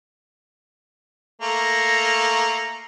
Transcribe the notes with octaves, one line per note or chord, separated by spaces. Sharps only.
A3 A#3